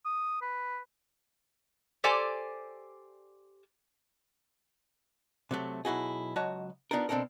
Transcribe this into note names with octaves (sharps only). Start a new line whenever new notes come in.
D#6
B4
G4 A4 C5 D5 G#5
C3 F#3 A3
B1 E4 F#4 G#4
C#2 F#3 F#4 C#5 D#5 A5
B3 D4 D#4 F4 A#4
B2 C4 D4 A4 A#4